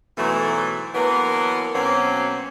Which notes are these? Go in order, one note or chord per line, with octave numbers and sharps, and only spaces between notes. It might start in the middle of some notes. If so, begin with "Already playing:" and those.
G#2 B2 E3 F#3 A3
D3 E3 F#3 A#3 B3 A#4
D2 B2 F#3 A#3 C4 C#4